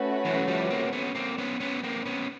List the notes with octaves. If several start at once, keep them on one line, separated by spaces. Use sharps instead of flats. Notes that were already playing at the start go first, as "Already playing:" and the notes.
Already playing: A3 C#4 F#4 B4
E3 F#3
F3 G3
A#3 C4
B3 C#4
A#3 C4
B3 C#4
B3 C#4
A#3 C4
B3 C#4